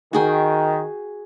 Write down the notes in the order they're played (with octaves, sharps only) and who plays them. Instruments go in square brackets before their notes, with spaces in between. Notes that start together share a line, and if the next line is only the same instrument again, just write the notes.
[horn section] D#3 [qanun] F#4 G#4 G5